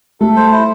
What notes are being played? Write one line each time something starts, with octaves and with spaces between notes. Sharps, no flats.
A3 A4
C5
E4